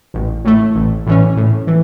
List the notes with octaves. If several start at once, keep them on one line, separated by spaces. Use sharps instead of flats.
A1
A2 A3
A1
A2 E3 C#4
A2
E3